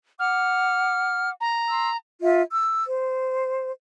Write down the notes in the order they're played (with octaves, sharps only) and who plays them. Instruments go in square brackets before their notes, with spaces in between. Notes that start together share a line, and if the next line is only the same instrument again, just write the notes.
[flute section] F#5 D6 [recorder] F6
[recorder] A#5
[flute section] C6 E6
F4 E5
E6
C5